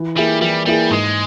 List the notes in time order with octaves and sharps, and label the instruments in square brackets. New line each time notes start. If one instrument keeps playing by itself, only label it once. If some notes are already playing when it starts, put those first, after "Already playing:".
Already playing: [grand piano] E3
[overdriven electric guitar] G3 [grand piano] A#3 E4 G#4
[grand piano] E3 [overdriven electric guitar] G3
[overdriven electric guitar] G3 [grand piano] A#3 E4 G#4
[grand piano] G#2 [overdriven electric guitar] G#3